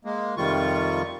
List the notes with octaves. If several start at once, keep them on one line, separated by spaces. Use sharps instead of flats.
G#3 A#3
F2 C3 D#3 G3 F4 C#6